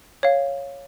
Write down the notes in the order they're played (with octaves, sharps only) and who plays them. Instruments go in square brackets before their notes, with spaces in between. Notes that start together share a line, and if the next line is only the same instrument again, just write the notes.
[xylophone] C#5 F5